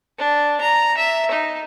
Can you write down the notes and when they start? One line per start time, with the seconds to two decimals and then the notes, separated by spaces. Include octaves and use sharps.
0.18 D4
0.61 A#5
0.97 E5
1.31 D#4